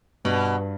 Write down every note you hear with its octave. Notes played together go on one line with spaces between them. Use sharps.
G2 B2